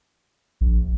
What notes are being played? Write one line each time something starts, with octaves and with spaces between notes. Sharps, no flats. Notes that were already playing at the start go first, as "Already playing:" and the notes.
A#1